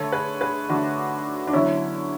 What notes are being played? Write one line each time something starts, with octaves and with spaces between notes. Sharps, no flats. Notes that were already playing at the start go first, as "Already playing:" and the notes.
Already playing: D3 A3 A4 C#5
G#4 B4
G#4 B4
D3 A3 D4 F#4
D4
D3 F#3 B3 C#4 E4